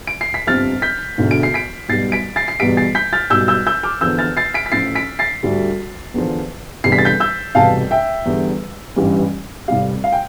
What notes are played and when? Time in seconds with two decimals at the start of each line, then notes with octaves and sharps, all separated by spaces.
0.07 D7
0.21 C7
0.34 B6
0.47 G1 F2 C3 F3 F6 A6
0.82 G6 B6
1.18 E1 D2 D3
1.31 D7
1.43 C7
1.54 B6 D7
1.88 B1 B2 G3 A6 C7
2.12 B6 D7
2.36 A6 C7
2.48 C7
2.60 E2 B2 G3 B6 D7
2.77 A6 C7
2.95 G6 B6
3.13 F6 A6
3.30 B1 B2 G3 E6 G6
3.48 E6 G6
3.67 E6 G6
3.83 D6 F6
4.01 E2 D3 F3 E6 G6
4.19 F6 A6
4.37 A6 C7
4.54 B6 D7
4.66 B6
4.72 A1 A2 F3 A6 C7
4.95 B6 D7
5.19 A6 C7
5.43 D2 D3 G3
6.14 E2 D3 F3
6.84 F1 E2 D3 G3 C7
6.92 B6
6.98 A6
7.05 G6 B6
7.20 E6 G6
7.55 F1 E2 B2 G3 F5 A5
7.91 E5 G5
8.26 E2 D3 G3
8.96 A1 G2 E3 G3
9.68 F1 F2 C3 G3 F5
10.04 F5
10.12 G5